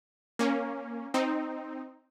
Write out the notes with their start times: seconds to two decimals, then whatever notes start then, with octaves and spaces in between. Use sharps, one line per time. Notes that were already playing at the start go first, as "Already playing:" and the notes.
0.39 A#3 C#4
1.14 C4 D#4